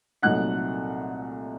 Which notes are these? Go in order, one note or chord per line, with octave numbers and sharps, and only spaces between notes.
C2 A#2 F#3 A3 D#4 F#5 F#6